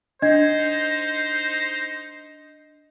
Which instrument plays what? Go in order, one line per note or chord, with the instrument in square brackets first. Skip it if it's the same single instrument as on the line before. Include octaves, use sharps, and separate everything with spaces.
[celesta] D4 D#5 G#6 [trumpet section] D#4 C5